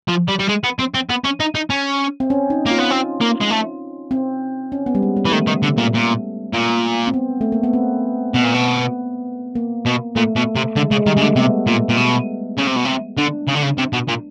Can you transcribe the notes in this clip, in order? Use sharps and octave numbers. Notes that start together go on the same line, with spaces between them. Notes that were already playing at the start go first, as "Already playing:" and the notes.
F3
G3
G3
G#3
B3
C4
C4
B3
C#4
D#4
D#4
C#4
C4
C#4
D#4
A#3
F4
B3
C4
A#3
G#3
A3
C4
C#4
B3
G3
G#3
G3
E3
D#3 A3
D#3
D3
A#2
A#2
A#2
C4
B3
A3
A#3
B3
C4
B2 B3
A#2
B2
A#3
B2
A#2 A3
B2
C3
D3 G#3
C#3 G#3
D#3 G3
C#3
D3 A3
C3 B3
A#2
A#2
B2
C#3
C3
B2
C3
D3 D4
C#3
D3
C#3
C3
B2
A#2